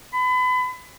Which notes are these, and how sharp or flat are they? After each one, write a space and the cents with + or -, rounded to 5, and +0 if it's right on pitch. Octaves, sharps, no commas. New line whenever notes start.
B5 +30